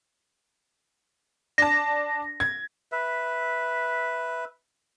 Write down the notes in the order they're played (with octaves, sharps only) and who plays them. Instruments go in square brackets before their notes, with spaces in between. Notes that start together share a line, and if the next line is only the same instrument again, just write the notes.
[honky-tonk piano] D4 A5 [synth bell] A#6
[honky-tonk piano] G#6
[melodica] B4 E5